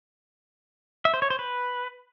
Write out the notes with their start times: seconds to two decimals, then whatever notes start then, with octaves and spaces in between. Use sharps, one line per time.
1.05 E5
1.14 C5
1.22 C#5
1.30 C5
1.39 B4